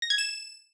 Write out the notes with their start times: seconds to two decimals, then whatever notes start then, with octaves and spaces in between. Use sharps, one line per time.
0.02 A#6
0.10 G#6
0.18 E7